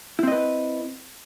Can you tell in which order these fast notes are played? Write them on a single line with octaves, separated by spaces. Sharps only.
E4 C4 D#5 B4